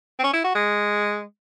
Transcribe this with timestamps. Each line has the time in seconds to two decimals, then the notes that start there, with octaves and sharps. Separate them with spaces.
0.19 C4
0.24 C#4
0.33 E4
0.44 F#4
0.55 G#3